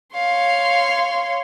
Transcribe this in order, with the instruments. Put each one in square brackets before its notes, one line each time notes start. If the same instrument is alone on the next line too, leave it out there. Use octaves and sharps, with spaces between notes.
[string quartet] C#5 F5 C6